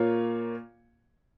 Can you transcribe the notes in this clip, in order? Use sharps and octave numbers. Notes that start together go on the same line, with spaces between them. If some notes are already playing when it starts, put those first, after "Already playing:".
Already playing: A#2 A#3 F4 C#5